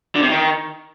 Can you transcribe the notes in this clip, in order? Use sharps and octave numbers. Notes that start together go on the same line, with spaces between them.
D3
C3
D#3